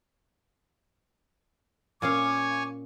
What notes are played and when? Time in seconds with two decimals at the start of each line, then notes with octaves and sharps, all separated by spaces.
2.02 A#2 C#4 C#5 F5 G#5 D6